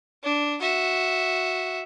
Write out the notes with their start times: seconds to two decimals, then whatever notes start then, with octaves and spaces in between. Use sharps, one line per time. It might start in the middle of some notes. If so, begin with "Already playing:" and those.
0.23 D4
0.61 F#4 E5